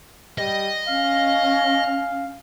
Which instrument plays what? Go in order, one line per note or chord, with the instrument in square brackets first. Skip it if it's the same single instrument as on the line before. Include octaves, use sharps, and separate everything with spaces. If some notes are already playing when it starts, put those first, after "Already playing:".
[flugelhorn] G3 [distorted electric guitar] D#5
[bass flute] C#4 [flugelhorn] F5